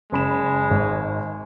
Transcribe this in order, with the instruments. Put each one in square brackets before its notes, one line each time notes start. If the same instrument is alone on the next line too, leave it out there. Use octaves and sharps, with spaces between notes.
[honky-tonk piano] F#1 B5 E7 [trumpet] G#3
[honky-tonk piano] G#1